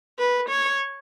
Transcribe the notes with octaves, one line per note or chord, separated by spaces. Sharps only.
B4
C#5